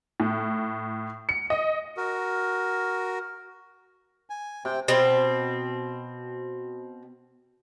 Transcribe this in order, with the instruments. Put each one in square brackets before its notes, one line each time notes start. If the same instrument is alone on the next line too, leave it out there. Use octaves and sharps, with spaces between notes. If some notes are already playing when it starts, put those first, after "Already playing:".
[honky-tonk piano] A2
C#7
D#5
[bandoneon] F#4 A#4
[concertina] G#5
[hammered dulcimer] C3 [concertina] C4 G5
[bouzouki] B2 C4